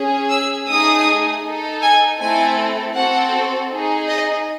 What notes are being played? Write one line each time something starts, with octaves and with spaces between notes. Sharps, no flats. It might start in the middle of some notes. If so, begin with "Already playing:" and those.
Already playing: C#4 G#4
E6
A3 D#4 G#4 D#6
D#4 A4
G#5
A3 C4 E4 A4 G#5
C4 F#4 A4 F#5
D#4 G#4
D#5